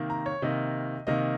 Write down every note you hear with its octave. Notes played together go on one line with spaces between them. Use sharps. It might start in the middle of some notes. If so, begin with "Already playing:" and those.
Already playing: C3 D#3 A#3
A#5
C#5
C3 D#3 A#3 D#5
C3 D#3 A#3 D#5